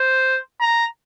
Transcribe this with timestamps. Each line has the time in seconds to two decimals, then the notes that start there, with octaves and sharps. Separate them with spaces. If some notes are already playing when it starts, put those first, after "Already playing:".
Already playing: C5
0.61 A#5